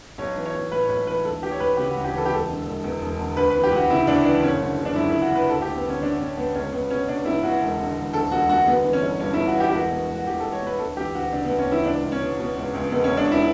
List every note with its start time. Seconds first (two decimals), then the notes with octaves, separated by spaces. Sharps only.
0.18 B1 C#5
0.36 E3
0.45 C#5
0.54 B1
0.72 A2 B4
0.85 C#5
0.89 B1 B4
1.07 E3 B4
1.25 D2 A4
1.42 E3 G4
1.51 C#5
1.60 D2 B4
1.77 C#3 G4
1.90 F#4
1.96 D2
2.04 G4
2.14 E3 A4
2.25 G4
2.31 E1 A4
2.49 D3
2.65 E1
2.84 E2
3.01 E1
3.19 D3
3.37 D2 B4
3.50 E3 B4
3.63 G4
3.71 D2 F#4
3.90 C#3 E4
4.07 D2 D4
4.25 E3 D4
4.42 F#1 C#4
4.60 D3
4.78 F#1
4.85 D4
4.96 F#2 E4
5.09 F#1 E4
5.22 F#4
5.31 D3 B4
5.49 D2 A4
5.62 G4
5.67 D2
5.76 B3
5.84 D3
5.89 C#4
6.02 D3 D4
6.19 D2 C#4
6.37 D2 B3
6.55 C#2 C#4
6.73 C#2 B3
6.90 B2 C#4
7.08 B2 D4
7.25 C#2 E4
7.44 C#2 F#4
7.62 E1
7.78 D3
7.96 E1
8.13 D2 A4
8.31 E1 F#4
8.49 D3 F#4
8.67 G1 B3
8.85 E3
8.93 C#4
9.02 G1
9.20 G2 C#4
9.33 G1 E4
9.47 F#4
9.56 E3 G4
9.69 G4
9.73 E1 F#4
9.91 B2
10.09 E1
10.15 F#4
10.26 E2 G4
10.40 E1 A4
10.52 C#5
10.62 B2 B4
10.79 D2 A4
10.97 E3 G4
11.14 D2 F#4
11.32 C#3 D4
11.45 D2 B3
11.59 C#4
11.68 E3 E4
11.85 C#2 D4
12.03 C#2
12.12 C#4
12.21 B2
12.39 B2
12.56 C#2
12.73 C#2
12.91 E1 B3
13.04 C#4
13.10 B2
13.17 D4
13.27 E1 E4